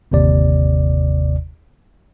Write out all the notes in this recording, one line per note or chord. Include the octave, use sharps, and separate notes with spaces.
G1 D#2 C3 D5